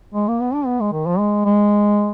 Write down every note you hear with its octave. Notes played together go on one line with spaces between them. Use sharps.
G#3
A#3
B3
D4
B3
G#3
D#3
F3
G#3
G#3